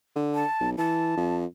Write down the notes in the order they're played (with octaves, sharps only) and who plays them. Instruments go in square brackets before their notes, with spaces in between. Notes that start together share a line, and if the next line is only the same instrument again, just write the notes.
[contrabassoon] D3
[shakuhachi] A5
[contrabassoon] B1
[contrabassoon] E3 [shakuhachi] A5
[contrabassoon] F2